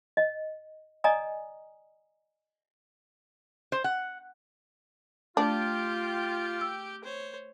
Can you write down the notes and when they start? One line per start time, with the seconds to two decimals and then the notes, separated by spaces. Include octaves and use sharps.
0.17 D#5
1.04 D5 D#5 G#5 A#5 D#6
3.72 C5
3.84 F#5
5.37 A3 D4 F4 G4 G5
6.61 E6
7.04 C5 C#5